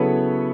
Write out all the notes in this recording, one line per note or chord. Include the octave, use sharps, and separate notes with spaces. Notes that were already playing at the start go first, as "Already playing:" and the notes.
Already playing: C#3 F#3 B3 E4 A4 B4 C#5